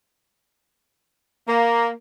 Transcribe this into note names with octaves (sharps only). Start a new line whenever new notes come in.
A#3